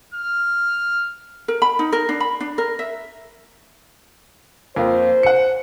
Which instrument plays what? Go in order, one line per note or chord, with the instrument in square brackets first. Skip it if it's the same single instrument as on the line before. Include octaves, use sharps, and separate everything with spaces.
[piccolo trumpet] F6
[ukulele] A#4
B5
D#4
A#4
D4
B5
D4
A#4
E5
[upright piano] F2 A#3 [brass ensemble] C5
[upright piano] F#5 C#7